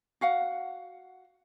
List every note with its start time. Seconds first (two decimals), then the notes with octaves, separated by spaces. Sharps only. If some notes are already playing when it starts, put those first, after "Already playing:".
0.21 F#4 F5 F#5